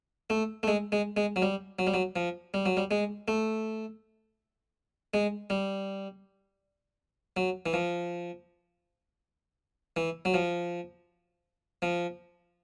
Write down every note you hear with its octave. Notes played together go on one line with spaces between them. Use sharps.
A3
A3
G#3
G#3
G#3
F#3
G3
F#3
G3
F#3
F3
G3
F#3
G3
G#3
A3
G#3
G3
F#3
E3
F3
E3
F#3
F3
F3